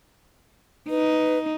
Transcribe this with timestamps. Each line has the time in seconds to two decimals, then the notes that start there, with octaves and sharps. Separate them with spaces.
0.90 D#4 B4